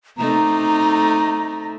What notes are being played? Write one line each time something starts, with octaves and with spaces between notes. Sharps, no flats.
C3 A3 D#4 A#5